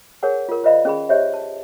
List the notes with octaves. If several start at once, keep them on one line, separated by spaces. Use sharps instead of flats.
G#4 A#4 C#5 F#5 G#5
F4 A#4
F4 C5 D5 D#5 F5 B5
C#4 G#4 B5
G4 C5 C#5 D#5 E5
A5